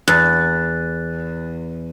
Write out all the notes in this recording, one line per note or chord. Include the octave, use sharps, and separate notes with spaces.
E2 F#6 A6